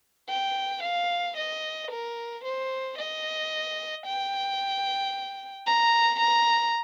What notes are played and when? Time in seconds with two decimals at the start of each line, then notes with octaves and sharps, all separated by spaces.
0.29 G5
0.83 F5
1.37 D#5
1.91 A#4
2.44 C5
2.98 D#5
4.06 G5
5.67 A#5
6.19 A#5